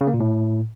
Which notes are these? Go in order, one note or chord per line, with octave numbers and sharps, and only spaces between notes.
C#3
A#3
A#2
A2